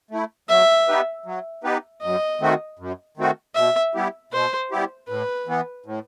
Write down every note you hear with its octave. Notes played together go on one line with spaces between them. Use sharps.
A3 E4
F#3 E5
B3 D#4 G4 B4
F#3
B3 D#4 G4 B4
F#2 D#5
D#3 A3 C4 F#4
F#2
D#3 A3 C4 F#4
B2 E5
G3 B3 E4 G4
B2 C5
G3 B3 E4 G4
A2 B4
E3 B3
A2